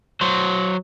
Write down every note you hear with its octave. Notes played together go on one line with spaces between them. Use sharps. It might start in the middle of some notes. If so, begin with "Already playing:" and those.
F#3 C5